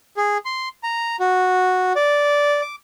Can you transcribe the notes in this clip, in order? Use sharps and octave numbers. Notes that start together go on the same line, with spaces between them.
G#4
C6
A#5
F#4
D5
D6